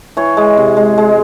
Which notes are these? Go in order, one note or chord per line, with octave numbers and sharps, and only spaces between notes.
E3 C#5
G#3
C3
G#3
G#3